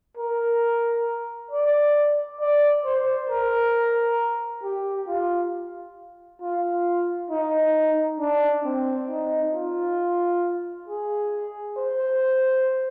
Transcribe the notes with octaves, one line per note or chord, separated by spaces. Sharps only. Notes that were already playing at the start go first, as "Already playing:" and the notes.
A#4
D5
D5
C5
A#4
G4
F4
F4
D#4
D4
C4
D#4
F4
G#4
C5